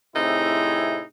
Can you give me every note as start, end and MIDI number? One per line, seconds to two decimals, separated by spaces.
0.15 1.03 45
0.15 1.03 48
0.15 1.03 60
0.15 1.03 63
0.15 1.03 64
0.15 1.03 68